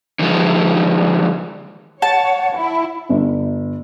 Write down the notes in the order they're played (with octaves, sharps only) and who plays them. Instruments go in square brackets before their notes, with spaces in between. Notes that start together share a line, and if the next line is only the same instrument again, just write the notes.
[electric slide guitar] D3 D#3 F3 G#3
[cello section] C#5 [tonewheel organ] F#5 [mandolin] A5
[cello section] E4
[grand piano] G1